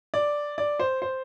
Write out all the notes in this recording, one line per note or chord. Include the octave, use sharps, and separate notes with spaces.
D5
D5
C5
C5